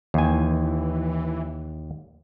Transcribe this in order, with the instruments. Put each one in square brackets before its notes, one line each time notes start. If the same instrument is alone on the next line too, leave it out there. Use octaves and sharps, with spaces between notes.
[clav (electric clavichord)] D#2 G#5 [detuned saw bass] E3